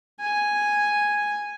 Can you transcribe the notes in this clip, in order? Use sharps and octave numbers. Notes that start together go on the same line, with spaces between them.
G#5